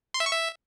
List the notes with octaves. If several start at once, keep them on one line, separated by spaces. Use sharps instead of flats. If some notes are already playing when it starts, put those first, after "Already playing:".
C6
E5
C#6
E5